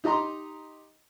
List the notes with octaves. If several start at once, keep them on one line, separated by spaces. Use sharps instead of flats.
D#4 G4 D#5 A#5 C6